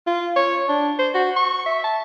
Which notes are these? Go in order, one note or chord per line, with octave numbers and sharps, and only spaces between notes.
F4
C#5
D4
C5
F#4
C#6
E5
A5